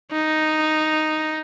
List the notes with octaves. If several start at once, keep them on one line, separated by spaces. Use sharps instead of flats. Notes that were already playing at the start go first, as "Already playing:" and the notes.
D#4